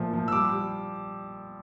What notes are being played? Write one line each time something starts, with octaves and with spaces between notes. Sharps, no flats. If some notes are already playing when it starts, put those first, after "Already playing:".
Already playing: A#2 F3 A3
F3
E6
G3 D6
G3